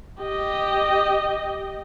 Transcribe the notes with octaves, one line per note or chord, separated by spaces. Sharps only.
G4 D#5